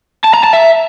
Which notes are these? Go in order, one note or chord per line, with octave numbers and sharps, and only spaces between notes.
A5
A#5
A5
E5